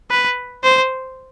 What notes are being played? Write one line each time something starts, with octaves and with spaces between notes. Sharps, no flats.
B4
C5